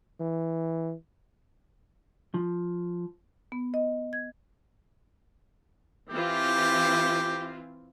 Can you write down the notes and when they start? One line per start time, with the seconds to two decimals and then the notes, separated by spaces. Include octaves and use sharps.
0.20 E3
2.34 F3
3.52 B3
3.74 D#5
4.13 G#6
6.11 E3 C4 F4 G4